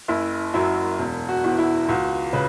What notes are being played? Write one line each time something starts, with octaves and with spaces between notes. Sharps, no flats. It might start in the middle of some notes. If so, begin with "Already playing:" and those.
F#1 E4
F#2 F#3 E4
E1
F#4
E2 E3
E4
C#2 F#4
C#3 B4